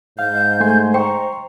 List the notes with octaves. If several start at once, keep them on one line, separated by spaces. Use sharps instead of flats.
G#2 F5 G6
A3 G#5 C6
C5 G5 A#5 C6 C#6